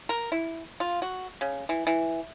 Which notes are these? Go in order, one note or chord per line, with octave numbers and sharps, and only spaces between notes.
A#4
E4
F4
F#4
C#3
E3
E3